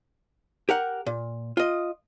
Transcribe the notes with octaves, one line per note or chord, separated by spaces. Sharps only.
G4 A#4 F#5
A#2
F4 D#5